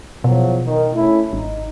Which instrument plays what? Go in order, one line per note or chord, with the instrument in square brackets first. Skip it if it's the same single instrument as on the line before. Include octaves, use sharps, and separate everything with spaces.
[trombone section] E2 F3 F#3 [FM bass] B2
[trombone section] D#3
A3 C#4 E4
[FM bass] G#1 [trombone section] D#4